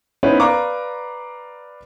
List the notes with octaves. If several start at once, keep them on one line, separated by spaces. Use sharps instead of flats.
B3 C#4 D#4 E4 B4 C5
B4 D5 F5 A#5 C#6 D6